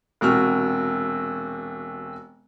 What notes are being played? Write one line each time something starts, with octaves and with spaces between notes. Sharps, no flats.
E1 C3 F#4 F6